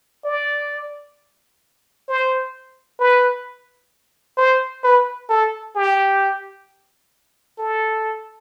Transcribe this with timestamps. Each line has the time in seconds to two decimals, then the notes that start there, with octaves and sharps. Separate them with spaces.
0.25 D5
2.08 C5
3.00 B4
4.37 C5
4.84 B4
5.29 A4
5.75 G4
7.59 A4